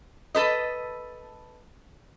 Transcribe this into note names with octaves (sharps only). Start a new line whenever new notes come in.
A4 B4 D#5